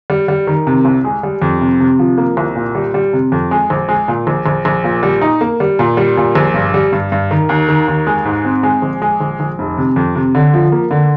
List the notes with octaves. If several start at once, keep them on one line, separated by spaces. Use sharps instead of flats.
G3
G3
D#3
C3
C2
G#3
G3
F2
C3
C3
F3
A#3
C2
A#2
G3
G3
C3
F2
G#3
A#1
G#3
A#2
A#1
A#1
A#1
A#2
G3
D#4
A#3
G3
A#2
G3
A#2
A#1
G2
G3
G2
G2
D#3
D#2
D#3
D#2
G#3
G#2
C4
G#3
A#1
G#3
A#1
A#1
F1
C3
F2
C3
D3
F3
A#3
D3